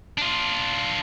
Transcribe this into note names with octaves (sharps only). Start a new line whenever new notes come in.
D4 F4